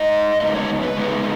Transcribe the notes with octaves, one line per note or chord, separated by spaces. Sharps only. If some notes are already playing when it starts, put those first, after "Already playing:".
Already playing: G#2 G#3 D#4 D#5
C#3 G#3 B3 D#4 D#5
C#5
B4
C#3 G#3 B3 D#4